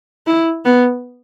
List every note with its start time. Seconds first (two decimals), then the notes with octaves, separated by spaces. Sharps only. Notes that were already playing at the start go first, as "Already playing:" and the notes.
0.27 E4
0.65 B3